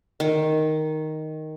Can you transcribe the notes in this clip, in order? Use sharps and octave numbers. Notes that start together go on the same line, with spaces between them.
D#3